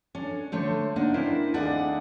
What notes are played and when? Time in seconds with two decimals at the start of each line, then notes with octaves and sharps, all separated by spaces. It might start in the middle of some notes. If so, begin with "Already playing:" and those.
0.15 C#4 D4 A4
0.52 D3 A3 C5 C#5
0.96 C#3 A#3 D4 D#4 F#5
1.14 C4 D4 E4 A#4 C5
1.54 D#2 A3 D4 G#4 D5 F#5